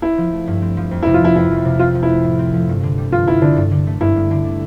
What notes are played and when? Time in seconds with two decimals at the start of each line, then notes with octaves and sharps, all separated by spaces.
0.02 C4 E4
0.18 F3
0.32 A3
0.47 G2
0.62 C4
0.77 F3
0.91 F2
1.03 E4
1.06 C3
1.14 F4
1.21 F3 E4
1.36 F2 E4
1.50 F2
1.65 C3
1.79 C4 F4
1.95 F3
2.03 E4
2.09 A3
2.24 A2
2.39 C4
2.54 F3
2.69 G2
2.83 D3
2.98 G3
3.12 G2 F4
3.27 G2 E4
3.42 D3 D4
3.56 G2
3.71 D3
3.87 A3
4.01 G2 E4
4.16 G2
4.31 D3
4.45 D4